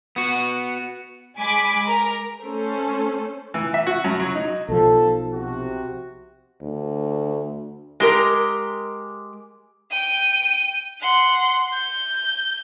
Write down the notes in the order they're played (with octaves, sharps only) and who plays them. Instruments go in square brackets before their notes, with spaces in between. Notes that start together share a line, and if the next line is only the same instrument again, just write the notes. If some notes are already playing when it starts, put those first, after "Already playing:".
[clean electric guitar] B3 F#4
[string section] G#3 G#5 B5 D6 B6
A#4
[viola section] A3 C#4 A4 C5
[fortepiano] E3
E5
F#4
F#2
F#3
D#4
[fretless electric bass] B1 F3 [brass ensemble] A4
[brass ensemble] C3 F#4
[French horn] D2
[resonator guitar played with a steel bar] G#3 G4 A#4
[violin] G5 D#7
F#5 C6
G6